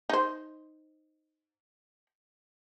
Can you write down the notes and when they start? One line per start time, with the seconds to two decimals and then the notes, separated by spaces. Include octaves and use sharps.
0.10 D#4 C5